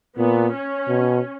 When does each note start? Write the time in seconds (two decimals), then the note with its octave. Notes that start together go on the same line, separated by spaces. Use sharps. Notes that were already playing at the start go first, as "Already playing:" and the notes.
0.17 A#2 B3
0.54 C#4
0.88 B2